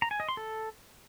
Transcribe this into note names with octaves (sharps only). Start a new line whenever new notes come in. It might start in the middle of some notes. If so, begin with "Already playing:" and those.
A#5
G#5
D#5
C6
A4